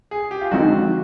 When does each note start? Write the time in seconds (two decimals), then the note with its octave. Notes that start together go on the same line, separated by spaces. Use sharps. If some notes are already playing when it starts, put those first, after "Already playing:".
0.11 G#4
0.31 G4
0.41 F4
0.51 D3 F3 G#3 C4 D#4 F#4